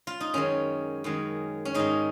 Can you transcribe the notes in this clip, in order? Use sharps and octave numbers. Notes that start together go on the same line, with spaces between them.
F4
D#4
F#2 D#3 G#3 C#4
F#2 D#3 G#3
C#4
G#2 D#3 G#3 D#4